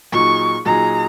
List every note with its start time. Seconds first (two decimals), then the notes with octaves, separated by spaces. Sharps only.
0.12 A#2 F#3 D#4 G#4 C#6
0.66 A#2 F#3 D#4 G#4 A#5